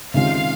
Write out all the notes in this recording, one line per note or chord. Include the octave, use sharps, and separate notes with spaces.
C3 D#3 G#3 C#4 F4 F5